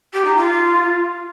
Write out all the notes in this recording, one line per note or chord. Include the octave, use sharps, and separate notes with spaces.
G4
D#4
F4